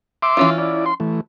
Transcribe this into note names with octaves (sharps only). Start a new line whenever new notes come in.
E5 C6 D6
E3 C#4 F4
E4 D5
C6
E3 A3